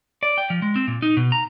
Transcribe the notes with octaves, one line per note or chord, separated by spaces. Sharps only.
D5
G5
F3
G#3
C4
A#2
D#4
B2
A#5